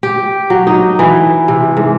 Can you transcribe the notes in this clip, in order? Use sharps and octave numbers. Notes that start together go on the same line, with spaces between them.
G4
F#3
D#4
E3
C3
G#2